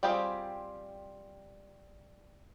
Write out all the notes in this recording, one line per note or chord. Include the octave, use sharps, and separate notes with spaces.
G3 C4 F4 G4 G#4